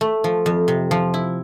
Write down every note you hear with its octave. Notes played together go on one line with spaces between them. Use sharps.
A3
F3
F2
C3
F3
E4